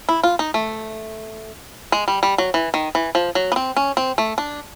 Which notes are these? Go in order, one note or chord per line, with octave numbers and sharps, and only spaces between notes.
E4
F4
D#4
A3
G#3
G3
G3
F#3
E3
D#3
E3
F3
F#3
B3
C4
C#4
C4
A3
D4